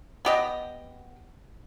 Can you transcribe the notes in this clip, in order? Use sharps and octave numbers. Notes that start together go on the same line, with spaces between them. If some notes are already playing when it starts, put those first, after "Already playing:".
B3 G4 D#5